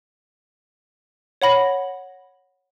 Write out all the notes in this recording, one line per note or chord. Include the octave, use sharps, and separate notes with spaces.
C#5 F#5 B5 A#6